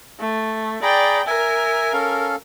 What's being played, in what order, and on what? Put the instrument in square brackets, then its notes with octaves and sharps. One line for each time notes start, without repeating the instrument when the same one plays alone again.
[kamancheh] A3
[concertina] G#4 A#5 B5 [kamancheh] D5 G5
[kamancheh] A#4 [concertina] E5 G#5
[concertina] C#4 A4 F5